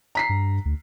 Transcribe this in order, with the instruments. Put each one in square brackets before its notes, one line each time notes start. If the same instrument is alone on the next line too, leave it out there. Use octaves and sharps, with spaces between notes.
[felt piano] A#5 B6 C7
[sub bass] G2
D2